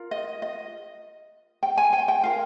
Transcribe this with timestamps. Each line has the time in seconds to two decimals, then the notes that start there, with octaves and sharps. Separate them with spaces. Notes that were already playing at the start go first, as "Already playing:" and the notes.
Already playing: F4 A#4
0.11 D#5
0.42 D#5
1.63 G5
1.77 G#5
1.93 G5
2.08 G5
2.24 F4 A#4 F5